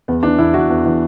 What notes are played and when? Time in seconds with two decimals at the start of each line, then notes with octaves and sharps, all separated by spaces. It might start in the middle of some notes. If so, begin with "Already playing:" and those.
0.08 E2 B3
0.23 E3 D4
0.38 E2 E4
0.54 E3 F#4
0.70 E2
0.85 E3